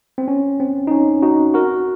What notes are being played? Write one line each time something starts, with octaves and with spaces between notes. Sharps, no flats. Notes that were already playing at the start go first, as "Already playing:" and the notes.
C4
C#4
C4
D#4
C#4
D#4 F#4
F#4 A#4